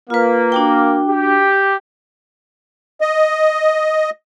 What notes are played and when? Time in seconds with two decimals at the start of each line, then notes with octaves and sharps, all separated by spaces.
0.10 A#3 F4 B4
0.52 D4 F#4 G5
1.08 G4
3.01 D#5